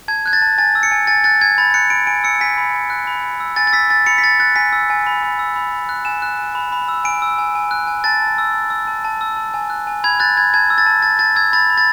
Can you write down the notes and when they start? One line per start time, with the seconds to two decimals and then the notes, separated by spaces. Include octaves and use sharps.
0.08 A5 G#6
0.26 F#6 G#6
0.33 A6
0.42 A5
0.58 G#5 A6
0.75 E6
0.83 C#7
0.91 G#5
1.07 G#5 A6
1.24 F#6 A6
1.41 G#5 G#6
1.58 B5 A6
1.74 F#6 C#7
1.90 B5 D7
2.07 G#5 D7
2.24 E6 C#7
2.41 G#5 B6
2.58 B5
2.74 B5
2.90 F#6
3.07 B5
3.23 B5
3.40 E6
3.56 G#5 A6
3.67 A6
3.73 E6 B6
3.89 G#5 A6
4.06 B5 C#7
4.18 B6
4.23 B5 A6
4.40 F#6 A6
4.56 G#5 B6
4.73 E6
4.90 G#5
5.07 B5
5.23 B5
5.39 E6
5.56 B5
5.72 B5
5.89 F#6
6.05 G#5 E7
6.22 F#6
6.39 G#5
6.55 B5
6.72 B5
6.89 E6
7.04 G#5 D7
7.22 E6
7.38 G#5
7.55 G#5
7.71 F#6
7.87 G#5
8.04 A5 A6
8.21 A5
8.38 E6
8.55 A5
8.70 E6
8.87 A5
9.05 A5
9.21 E6
9.37 A5
9.54 G#5
9.70 F#6
9.87 G#5
10.04 B5 G#6
10.20 F#6 A6
10.36 B5 G#6
10.54 A5 G#6
10.70 E6
10.78 A6
10.86 A5
11.03 A5 A6
11.19 A5 A6
11.36 E6 G#6
11.53 B5 A6
11.70 B5
11.78 A6